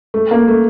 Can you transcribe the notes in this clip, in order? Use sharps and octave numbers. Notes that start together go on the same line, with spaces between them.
A3
A#3
A3